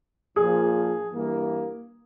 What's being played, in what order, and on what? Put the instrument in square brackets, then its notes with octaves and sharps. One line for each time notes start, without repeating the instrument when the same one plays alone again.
[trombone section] A#1 A#2 F3 [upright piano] G#4
[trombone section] G2 E3 A#3